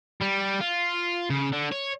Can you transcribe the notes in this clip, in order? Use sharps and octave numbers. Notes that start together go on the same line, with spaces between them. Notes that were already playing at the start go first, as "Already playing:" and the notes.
G3
F4
C#3
D3
C#5